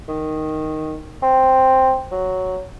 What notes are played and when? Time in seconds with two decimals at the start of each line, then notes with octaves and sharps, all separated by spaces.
0.08 D#3
1.23 C4
2.12 F#3